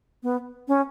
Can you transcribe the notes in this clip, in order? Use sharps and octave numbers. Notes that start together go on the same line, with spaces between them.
B3
C#4